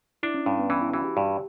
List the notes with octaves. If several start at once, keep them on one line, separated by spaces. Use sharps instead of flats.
D4 E4
C#4
G2 C#4
B3
E3 C#4
E4
E3 F#4
G4
G2 G4